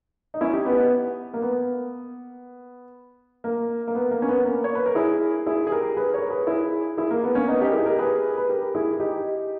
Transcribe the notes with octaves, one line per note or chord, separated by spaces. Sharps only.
D#4
C#4 E4
D#4 G4
B3
B3
A#3
B3
A#3
A#3
B3
A#3
C#4
B3
A#3
C#5
B4
A#4
E4 G#4
E4 G#4
G#4
G4 A#4
G#4 B4
A#4 C#5
G#4 B4
E4 G#4
E4 G#4
A#3
B3
A#3 C#4
B3 D#4
D#4 G4
A#4
E4 G#4
G4 A#4
G#4 B4
B4
G4 A#4
E4 G#4
D#4 G4